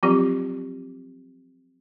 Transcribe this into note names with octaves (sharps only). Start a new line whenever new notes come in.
F3 F#3 C4 F4 G4